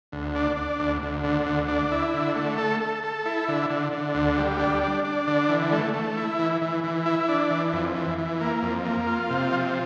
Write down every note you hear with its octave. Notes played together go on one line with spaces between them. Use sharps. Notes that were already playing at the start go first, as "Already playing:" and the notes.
D2
D4
D4
D2
D2
D3
D2
D4
E4
D3
A3
A4
A4
A4
E4
D3
D3
D3
D2
G3
D4
D4
D4
D3
E3
A3
A3
E4
E3
E3
E3
E4
D4
E3
F2
E3
E3
A#3
F2
A#3
F4
C3
F3